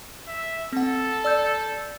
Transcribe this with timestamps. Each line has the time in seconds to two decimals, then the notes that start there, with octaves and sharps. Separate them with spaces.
0.28 E5
0.73 C4 A4 F#5
1.24 D5 E6 G6